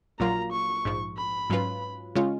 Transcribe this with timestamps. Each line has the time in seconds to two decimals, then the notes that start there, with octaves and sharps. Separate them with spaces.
0.19 A#1 A#2 F#3 A#3 F4 A#5
0.52 C#6
0.85 A#1 G#2 F3
1.17 B5
1.50 G#2 F#3 C#4 F4 B4
2.15 C#3 G#3 C#4 F4